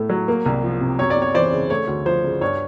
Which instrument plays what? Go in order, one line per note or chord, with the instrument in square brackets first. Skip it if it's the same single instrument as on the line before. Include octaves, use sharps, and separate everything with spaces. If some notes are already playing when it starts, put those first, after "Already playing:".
Already playing: [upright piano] A2 A3
F#3
A#3
C2
F3
C3
F#2 C#5
D5
F#2
C#5
E3 C5 D5
C#3
A3 C#5
D2
F3 C5
C#3
G2 C#5